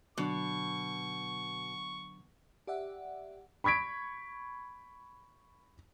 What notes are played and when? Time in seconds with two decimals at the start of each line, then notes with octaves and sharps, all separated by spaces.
0.18 B2 D3 F#3 D4 C#6
2.67 G4 D5 E5 F#5
3.64 B5 C#6 G#6 B6 D7